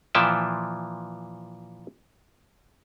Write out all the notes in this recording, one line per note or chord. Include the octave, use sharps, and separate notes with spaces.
A#2 E3 F3 E5 G5 A5